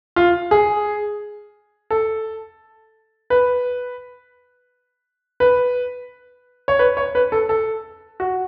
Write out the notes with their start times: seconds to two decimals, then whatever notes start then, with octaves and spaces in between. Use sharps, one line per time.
0.16 F4
0.51 G#4
1.90 A4
3.30 B4
5.40 B4
6.68 C#5
6.79 B4
6.97 C#5
7.15 B4
7.32 A4
7.49 A4
8.20 F#4